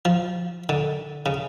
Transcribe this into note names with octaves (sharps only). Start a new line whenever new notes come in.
F3
D3
C#3